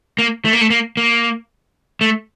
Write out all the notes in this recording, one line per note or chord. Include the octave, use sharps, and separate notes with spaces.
A#3
A3
A#3
A3
A#3
A#3
A3